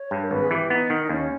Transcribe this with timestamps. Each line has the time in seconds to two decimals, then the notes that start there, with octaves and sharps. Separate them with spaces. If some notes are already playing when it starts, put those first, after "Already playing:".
Already playing: C#5
0.11 G2
0.22 A#4
0.31 G#1 B4
0.41 G#4
0.51 E3 G4
0.70 B3 D#4
0.90 D#3
1.04 D#4
1.09 D#2 C#4